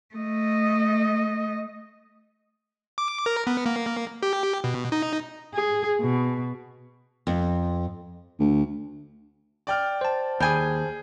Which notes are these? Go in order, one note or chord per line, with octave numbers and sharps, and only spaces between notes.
A3 D#5
D6
A#4
B3
A#3
G4
B2
D#4
G#4
B2
F2
D2
D5 G5 F6
C5 A5
D#2 G3 G#4 G#5 G6